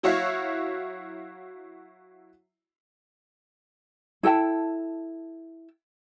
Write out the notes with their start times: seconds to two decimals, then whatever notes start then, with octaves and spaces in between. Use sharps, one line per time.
0.03 F#3 E4 F#4 C#5 E5 F5
4.23 E4 A4 G5 A5